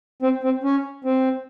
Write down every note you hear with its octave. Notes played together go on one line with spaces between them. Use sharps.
C4
C4
C#4
C4